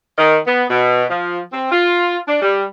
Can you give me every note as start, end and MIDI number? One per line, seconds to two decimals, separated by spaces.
0.17 0.37 51
0.46 0.63 59
0.69 1.04 47
1.09 1.39 53
1.52 1.69 60
1.71 2.18 65
2.27 2.38 62
2.42 2.63 55